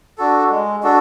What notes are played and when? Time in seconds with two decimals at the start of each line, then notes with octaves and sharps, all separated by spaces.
0.18 D4 F#4 A4
0.50 G#3
0.83 D4 F#4 A4